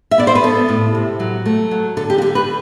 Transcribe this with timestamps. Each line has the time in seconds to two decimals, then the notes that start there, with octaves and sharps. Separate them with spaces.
0.11 E5
0.18 B3 D5
0.27 C5
0.35 B4
0.44 B3 A4
0.69 A2
0.95 C3
1.20 F#3
1.46 A3
1.71 F#3
1.97 D3 A4
2.10 G4
2.18 F#4
2.22 D3 G4
2.35 B4